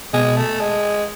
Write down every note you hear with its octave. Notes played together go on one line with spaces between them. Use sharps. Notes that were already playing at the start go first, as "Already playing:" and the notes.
B2 G#3
A3
G#3